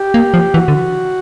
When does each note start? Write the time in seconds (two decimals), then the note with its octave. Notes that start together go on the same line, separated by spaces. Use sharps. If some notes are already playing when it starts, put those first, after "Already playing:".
Already playing: G4
0.14 A#3
0.34 F3
0.54 E3 F#4
0.68 D3